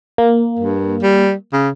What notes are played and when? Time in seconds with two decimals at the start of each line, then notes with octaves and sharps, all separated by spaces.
0.18 A#3
0.59 G2
1.02 G3
1.53 C#3